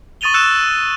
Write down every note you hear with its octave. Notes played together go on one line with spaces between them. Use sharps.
C#6 D#6 A6 D#7 F7 G7
E6 F#6 A6 C#7 E7